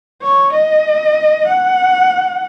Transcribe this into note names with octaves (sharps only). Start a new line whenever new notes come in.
C#5
D#5
F#5